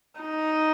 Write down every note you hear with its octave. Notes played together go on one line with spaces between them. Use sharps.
D#4